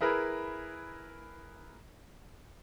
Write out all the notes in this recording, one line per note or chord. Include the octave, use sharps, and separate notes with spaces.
E4 G#4 A#4 B4